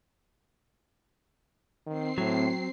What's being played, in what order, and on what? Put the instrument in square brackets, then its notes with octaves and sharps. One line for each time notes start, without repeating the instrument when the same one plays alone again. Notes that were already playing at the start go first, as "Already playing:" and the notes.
[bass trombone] D#3 [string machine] C4 C7
[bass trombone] A2 [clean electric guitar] F#3